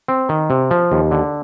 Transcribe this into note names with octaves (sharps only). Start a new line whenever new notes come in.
C4
D#3
C3
F3
D#2
D3